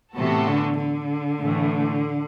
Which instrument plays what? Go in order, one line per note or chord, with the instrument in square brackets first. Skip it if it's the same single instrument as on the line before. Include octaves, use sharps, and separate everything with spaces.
[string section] A2 E3 B3 F#4 A4 [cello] C3
[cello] D3
D3
[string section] A2 E3 A3